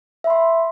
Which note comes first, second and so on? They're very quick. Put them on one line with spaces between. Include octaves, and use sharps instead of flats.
E5 B5 C6